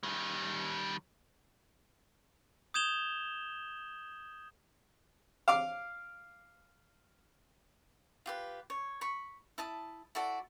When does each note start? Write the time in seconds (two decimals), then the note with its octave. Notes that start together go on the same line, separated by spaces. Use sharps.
0.03 D#3 G3
2.74 D#6 G6 G#6 E7 F7 G7
5.48 F5 D6 F6
8.26 F4 G4 B4
8.70 C#5
9.01 B5 C#6
9.58 E4 A5 D#6
10.15 E4 F#4 A4 D5